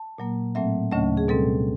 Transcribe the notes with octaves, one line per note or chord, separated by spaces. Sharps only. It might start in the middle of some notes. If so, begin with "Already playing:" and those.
Already playing: A5
A#2 F#3 A#3
A2 F#3 A3 C4 E5
D2 C#3 F#3 A3 C#4 D#5
G#4
B2 G3 C4 A4